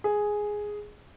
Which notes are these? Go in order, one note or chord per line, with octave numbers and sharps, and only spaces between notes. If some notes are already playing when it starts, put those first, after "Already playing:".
G#4